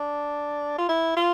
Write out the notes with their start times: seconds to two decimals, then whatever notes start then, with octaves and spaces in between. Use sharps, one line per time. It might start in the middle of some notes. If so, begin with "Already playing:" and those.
Already playing: D4
0.78 F4
0.89 E4
1.17 F4